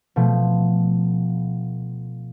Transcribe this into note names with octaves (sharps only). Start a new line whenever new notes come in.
B2 F3 A3